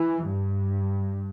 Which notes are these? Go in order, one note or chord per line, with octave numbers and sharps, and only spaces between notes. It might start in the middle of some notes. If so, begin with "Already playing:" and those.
Already playing: E3
G2